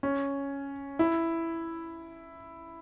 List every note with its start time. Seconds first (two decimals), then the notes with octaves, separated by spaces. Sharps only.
0.03 C#4
0.99 E4